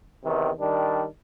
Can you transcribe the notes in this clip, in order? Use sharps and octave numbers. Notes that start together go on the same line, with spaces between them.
E2 C3 D#3
D#3 G3 D4